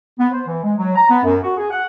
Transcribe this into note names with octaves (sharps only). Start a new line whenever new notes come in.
B3
C5
E3
G#3
F#3
A#5
B3
F#2
F#4
G#4
F#5